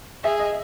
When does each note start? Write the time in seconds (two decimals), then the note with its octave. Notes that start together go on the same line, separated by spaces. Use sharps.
0.24 G#4 E5
0.39 D#5